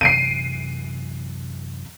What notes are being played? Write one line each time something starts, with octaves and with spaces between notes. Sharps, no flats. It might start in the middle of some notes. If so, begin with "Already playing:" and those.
F#2 C3 E3 C7 D7 D#7